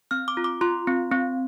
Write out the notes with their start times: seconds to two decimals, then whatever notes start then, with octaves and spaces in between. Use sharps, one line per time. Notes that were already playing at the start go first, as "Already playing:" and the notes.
0.11 C4 F6
0.28 D6
0.37 F4
0.44 D6
0.61 F4 C6
0.87 C4
1.12 C4